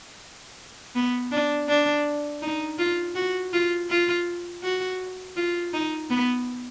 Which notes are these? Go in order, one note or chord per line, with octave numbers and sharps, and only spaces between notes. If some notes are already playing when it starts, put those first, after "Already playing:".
B3
D4
D4
D#4
F4
F#4
F4
F4
F#4
F4
D#4
B3